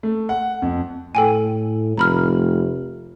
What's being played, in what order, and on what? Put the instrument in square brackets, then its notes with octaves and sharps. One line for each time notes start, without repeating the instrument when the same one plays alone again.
[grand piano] A3
F#5
F2
[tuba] A2 [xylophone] A4 G5 G#5
[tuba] F1 [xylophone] A#5 B5 F6